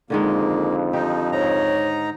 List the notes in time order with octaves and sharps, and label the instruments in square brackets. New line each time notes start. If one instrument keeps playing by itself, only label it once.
[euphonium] F2 [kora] D3 D#3 G#3 [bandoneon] A#3
[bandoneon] F3 D#4 [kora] G4
[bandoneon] G#2 D#4 A#5 [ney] C#5